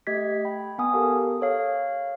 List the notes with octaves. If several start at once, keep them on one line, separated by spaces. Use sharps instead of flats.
A3 G4 D#5 G#6 B6
G5 B5
B3 G#5 D#6
G4 A4 A#4 F5 A5
A4 C#5 F5